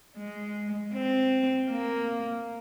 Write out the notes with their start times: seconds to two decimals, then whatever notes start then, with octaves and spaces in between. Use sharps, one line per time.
0.17 G#3
0.93 C4
1.70 A#3